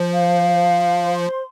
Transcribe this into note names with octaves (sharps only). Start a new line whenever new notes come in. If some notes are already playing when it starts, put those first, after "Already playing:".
Already playing: F3 C5
F5
C6
C5